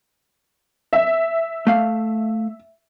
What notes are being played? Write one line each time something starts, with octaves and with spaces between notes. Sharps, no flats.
E5
A3 F5